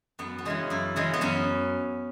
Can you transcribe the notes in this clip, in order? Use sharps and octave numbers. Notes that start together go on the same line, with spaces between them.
F#2 B3
B3
C#3 E3 G#3 C#4
F#2 E4
C#3 E3 G#3
B3
F#2 C#4